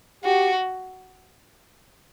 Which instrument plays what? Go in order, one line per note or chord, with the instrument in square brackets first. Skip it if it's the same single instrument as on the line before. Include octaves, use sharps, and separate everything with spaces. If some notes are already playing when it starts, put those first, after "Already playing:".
[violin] F#4 [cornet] G4